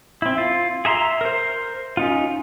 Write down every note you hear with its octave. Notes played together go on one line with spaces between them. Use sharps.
C4 E4
F4
G#4 E5 A#5 C6
A#4 C5
C#4 D#4 F4